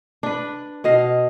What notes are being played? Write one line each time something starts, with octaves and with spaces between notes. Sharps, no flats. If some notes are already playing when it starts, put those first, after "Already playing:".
D4 B4
B2 D#5 F5